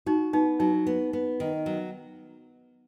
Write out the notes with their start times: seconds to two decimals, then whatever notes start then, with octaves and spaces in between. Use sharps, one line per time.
0.06 D#4 F#4
0.33 B3 D#4
0.60 F#3 D#4
0.87 B3
1.13 B3
1.40 D#3
1.66 F#3